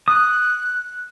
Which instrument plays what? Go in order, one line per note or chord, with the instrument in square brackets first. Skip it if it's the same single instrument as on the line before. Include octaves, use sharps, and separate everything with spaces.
[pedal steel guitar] D#6 [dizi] F#6